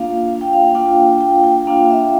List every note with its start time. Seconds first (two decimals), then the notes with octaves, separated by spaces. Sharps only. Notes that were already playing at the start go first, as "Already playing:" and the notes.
Already playing: A#3 D4 F4 F5
0.28 F5
0.41 G5
0.53 F5
0.75 A#3 D4 F4 G5
1.21 G5
1.44 G5
1.67 A#3 D4 F4 F5
1.83 F5
1.90 E5